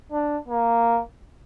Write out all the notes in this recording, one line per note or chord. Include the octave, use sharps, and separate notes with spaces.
D4
A#3